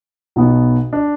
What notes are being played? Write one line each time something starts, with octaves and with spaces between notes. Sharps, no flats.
B1 B2 B3
D4